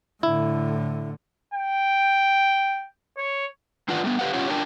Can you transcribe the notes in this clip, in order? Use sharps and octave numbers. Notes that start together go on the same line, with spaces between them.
A2 D3 E4
G5
C#5
D#3 E3 D4 F4 B4 F#5
G3 A3 B3
G4 B4 F5 F#5
C#4 F4 G4 C#5 F#5
D4 F4 A#4 G5 A5